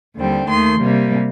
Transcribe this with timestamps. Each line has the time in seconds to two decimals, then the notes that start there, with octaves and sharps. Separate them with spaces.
0.17 D#2 D3 G3 C4
0.49 D#2 D#3 A3 C6
0.81 C3 G3 A#3